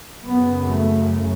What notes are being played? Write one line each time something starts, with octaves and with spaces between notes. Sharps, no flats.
F#2 C#3 B3
A3